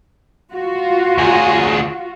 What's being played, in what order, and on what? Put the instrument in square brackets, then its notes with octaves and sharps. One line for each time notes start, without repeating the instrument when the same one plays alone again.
[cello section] F4 F#4
[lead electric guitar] D2 G#4